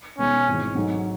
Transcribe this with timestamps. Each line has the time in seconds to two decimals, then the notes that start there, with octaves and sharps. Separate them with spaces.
0.18 B2 G#3 B3 C#4 D#4
0.48 G#1 G#2 E3 G#3
0.75 G#2 F#3 A3 D#4